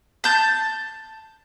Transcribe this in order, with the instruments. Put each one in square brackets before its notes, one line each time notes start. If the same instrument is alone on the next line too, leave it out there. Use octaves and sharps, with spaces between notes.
[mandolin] A5 G6